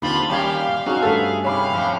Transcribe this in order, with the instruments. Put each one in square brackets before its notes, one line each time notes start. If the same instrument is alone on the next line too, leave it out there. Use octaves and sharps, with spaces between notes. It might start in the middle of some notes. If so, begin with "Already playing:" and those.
[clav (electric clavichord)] D#2 C4 [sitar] D3 F4 [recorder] B5
[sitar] D#2 G3 G4 [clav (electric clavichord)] C#4 A#4 G#5 [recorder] F5
[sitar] C4 G#4 [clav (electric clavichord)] C#4 D#4 [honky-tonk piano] F#4
[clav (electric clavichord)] G2 C#4 A4 [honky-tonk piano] A3 [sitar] B3 G#4
[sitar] C3 [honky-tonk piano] C#5 B5 D6 [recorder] F5
[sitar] F2 A2 C4